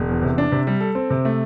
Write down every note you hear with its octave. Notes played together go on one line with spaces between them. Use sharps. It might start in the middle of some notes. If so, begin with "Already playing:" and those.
Already playing: E1
E2
C3
D4
C3
G3
A4
C4
C3
A3